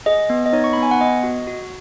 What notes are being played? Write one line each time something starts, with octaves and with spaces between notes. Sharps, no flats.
G#4 D#5
B3
D#5
D#4 C#5
C#6
B5
B3
G#5
F#5
B3 D#5
F#4
F#4